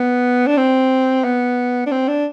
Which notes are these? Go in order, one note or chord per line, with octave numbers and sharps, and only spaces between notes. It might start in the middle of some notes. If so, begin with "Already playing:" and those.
Already playing: B3
D4
C4
B3
D4
C4
D4